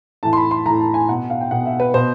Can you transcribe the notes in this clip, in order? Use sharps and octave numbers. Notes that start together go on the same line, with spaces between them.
A2 E3 A5
C6
B5
C6
A2 E3 A#5
A5
G#5
B2 F#5
F5
G5
B2 F#5
E5
B4
B2 C5